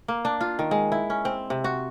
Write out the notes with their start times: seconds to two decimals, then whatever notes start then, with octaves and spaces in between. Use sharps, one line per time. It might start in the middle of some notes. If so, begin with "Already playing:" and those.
0.08 A#3
0.25 D4
0.41 F4
0.59 D#3
0.71 G#3
0.92 E4
1.10 C#4
1.25 C4
1.50 C3
1.64 F#4